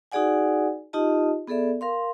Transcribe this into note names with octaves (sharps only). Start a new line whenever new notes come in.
D#4 F#4 G#4 D5 F#5 G#5
D#4 F4 G4 D#5 A5
B3 G#4 A4 D5 E5
A#4 F5 C6